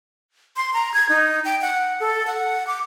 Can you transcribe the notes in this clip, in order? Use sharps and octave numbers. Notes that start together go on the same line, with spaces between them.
C6
A#5
G#6
D#4
G5
F#5
A4
F#5
D6